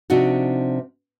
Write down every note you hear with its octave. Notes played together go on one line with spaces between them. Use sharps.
C3 F3 C4 D4 D#4 F#4